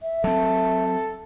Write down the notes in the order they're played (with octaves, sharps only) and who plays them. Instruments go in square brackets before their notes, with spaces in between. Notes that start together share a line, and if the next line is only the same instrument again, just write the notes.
[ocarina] E5
[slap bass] F#3 C4 [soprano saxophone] A4